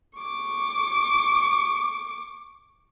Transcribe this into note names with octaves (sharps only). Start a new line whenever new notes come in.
C#6 D6